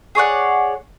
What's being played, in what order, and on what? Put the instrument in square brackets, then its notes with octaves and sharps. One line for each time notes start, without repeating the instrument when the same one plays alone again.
[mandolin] G#4 C#5 D5 F#5